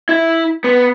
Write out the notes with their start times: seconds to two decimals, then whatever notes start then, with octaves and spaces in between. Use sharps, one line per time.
0.09 E4
0.64 B3